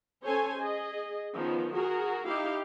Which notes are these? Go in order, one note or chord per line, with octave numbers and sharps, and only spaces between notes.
C#4 A4 C5 C#5 G#5
G#4 D#5
D#3 F3 B3 C#4
F#4 G#4 A#4
D#4 E4 G4 F5